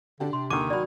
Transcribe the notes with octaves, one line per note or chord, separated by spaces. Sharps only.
D3 D4 G4
C3 C6
D#2 D3 D#3 G#5 D6
F#3 F#4 D5 B5